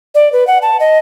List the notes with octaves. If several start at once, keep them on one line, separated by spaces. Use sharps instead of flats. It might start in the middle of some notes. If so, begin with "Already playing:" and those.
D5
B4
F#5
A5
D#5